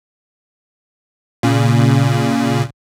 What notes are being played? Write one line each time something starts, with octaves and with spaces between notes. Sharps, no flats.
A#2 C#3